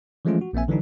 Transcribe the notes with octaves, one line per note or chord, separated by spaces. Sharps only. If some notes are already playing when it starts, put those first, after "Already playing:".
E3 F3 G#3 A3 C#4 F4
F#4
A#1 A#3 C4 E5 G#5
D3 E3 F#3 D4 D#4